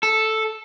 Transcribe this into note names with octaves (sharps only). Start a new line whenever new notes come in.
A4